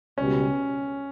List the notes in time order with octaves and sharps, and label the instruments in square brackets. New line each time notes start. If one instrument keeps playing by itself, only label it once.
[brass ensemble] C#2 B2 G3 [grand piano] C#4